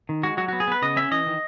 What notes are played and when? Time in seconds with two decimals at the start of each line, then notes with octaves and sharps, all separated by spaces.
0.09 D#3
0.23 G#3 F#4
0.37 F#3 F#4
0.48 B3 F#4
0.60 G#4
0.68 B3 B4
0.82 C#3 D#5
0.97 C#4 E5
1.11 E3 D#5
1.27 D#3